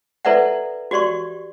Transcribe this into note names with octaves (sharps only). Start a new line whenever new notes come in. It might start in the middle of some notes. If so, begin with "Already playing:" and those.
E4 A4 B4 D5 E5 F#5
F#4 G4 D5 C6 C#6